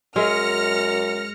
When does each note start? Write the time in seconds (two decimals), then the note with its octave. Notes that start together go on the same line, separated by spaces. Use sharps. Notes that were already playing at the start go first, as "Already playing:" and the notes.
0.16 F#2 G#3 G#4 D#5 E5 F6 A#6 C#7